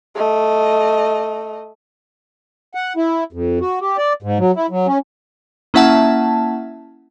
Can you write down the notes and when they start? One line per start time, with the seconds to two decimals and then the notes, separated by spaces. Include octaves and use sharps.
0.15 A3 D#5
2.75 F#5
2.96 E4
3.33 F2
3.61 F#4
3.81 G4
3.98 D5
4.23 G#2
4.39 F#3
4.56 E4
4.70 F#3
4.87 C#4
5.74 A#3 C#4 E4 E5 F#5 A5